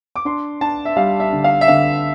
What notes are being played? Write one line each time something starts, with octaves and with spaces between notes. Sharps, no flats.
D6
D4 C6
D4 A5
E5
G3 F5
E5
D3
F5
E5
D3 F5